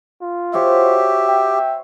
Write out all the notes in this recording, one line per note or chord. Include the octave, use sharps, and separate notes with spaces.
F4
F#4 G4 C5 C#5 E5
G5